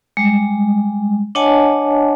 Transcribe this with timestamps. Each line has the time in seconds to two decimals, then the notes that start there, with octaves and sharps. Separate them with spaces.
0.17 G3 G#3
1.35 D4 C#5 D#5 F#5 G#5 A5